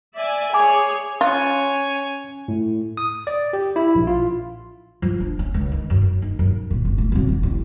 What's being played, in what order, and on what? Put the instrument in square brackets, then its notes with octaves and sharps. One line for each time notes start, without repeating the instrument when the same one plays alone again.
[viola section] D5 E5 G#5
[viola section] G#4 C#5 [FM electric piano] G#5 D6
[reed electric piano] C#4 F#6 [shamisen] F4 [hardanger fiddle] C#5 G#5
[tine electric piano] A2
D#6
D5
G4
E4
A#1
F4
[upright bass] F3
D4
C#4
C#2
D#3
F#2
F#2
D#4
F#2
A#2
F#1
A3
C2 F#2
D3
A1